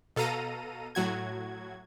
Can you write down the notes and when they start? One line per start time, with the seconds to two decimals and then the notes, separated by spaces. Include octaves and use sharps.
0.16 B2 A4 F5 A#5 D#7
0.95 A2 F#3 F#4 G#6